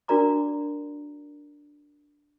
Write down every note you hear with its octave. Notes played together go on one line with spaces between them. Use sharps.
D4 F#4 A#4 D5 A#5 D6